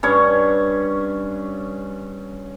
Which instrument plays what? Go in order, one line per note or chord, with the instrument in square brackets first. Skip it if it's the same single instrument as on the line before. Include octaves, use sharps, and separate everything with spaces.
[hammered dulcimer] G2 C#4 C#5